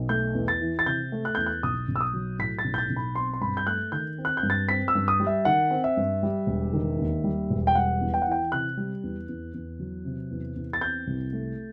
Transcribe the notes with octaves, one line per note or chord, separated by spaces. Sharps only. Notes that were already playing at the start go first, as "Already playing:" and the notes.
Already playing: B1
A3 G6
E2
A6
E3
A6
C3 G6
A3
F#6
E2 G6
F#6
B1 D#6
B1
E6
D#6
F#3
A2 B6
A6
B1
G6
A6
B1
B5
C4 C6
C6
G2 B5
G6
A3 F#6
D#3 G6
C4
F#6
G6
G2
A6
C4 B6
E6
G2
D#6
G3
E5
D#3 F#5
C4
E5
G2
G3
E1
D#3
D#2
G3
E1
G5
G3 F#5
E2
G5
F#5
E3 G5
C3 F#6
G3
E2
E2
E2
F#3
C3
E2
E2
A6
C4 G6
C2
A3